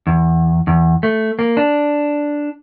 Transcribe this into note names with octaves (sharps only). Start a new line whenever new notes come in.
E2
E2
A3
A#3
D4